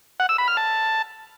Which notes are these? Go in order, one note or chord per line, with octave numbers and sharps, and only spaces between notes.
F#5
E6
B5
F6
A5